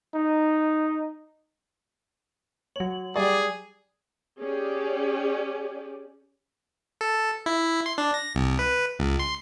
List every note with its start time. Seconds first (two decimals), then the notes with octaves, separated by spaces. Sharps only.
0.14 D#4
2.76 F#3 C#5 F#7
3.16 G3 G#4 D5
4.42 C#4 G4 G#4 D5
7.01 A4
7.46 E4
7.86 C6
7.98 D4
8.14 A#6
8.35 C2
8.59 B4
8.99 C#2
9.19 C6